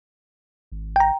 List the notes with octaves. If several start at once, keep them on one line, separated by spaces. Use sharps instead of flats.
G#1
G5 A#5